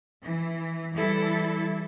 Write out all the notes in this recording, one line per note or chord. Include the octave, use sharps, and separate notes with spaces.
E3
E3 G3 E4 A4